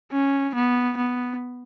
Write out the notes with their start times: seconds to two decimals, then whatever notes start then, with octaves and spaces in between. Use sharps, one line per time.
0.12 C#4
0.55 B3
0.97 B3